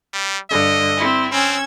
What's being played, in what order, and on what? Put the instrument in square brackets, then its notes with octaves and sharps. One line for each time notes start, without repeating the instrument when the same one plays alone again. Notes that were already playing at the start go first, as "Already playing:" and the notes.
[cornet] G3
[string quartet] G2 D3 [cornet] D#5
[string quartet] C4 E4
[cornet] C4 [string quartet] C#4 E6 G#6